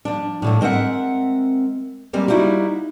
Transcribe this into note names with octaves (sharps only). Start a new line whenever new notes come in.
F3 D4
A2 D3 F3
G#3 C4 A#4 E5 F#5
G3 G#3 A#3 C4
G3 A#3 D#4 E4 F#4